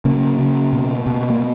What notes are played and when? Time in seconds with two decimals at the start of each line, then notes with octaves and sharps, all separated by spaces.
0.05 C#3 A#3
0.39 C#3
0.73 B2
1.07 B2
1.30 A#3